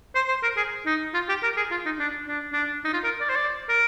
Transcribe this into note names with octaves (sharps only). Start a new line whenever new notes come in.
C5
C5
A#4
G#4
D#4
F4
G4
A#4
G#4
F4
D#4
D4
D4
D4
D#4
F4
A#4
D5
C5
D5
A#4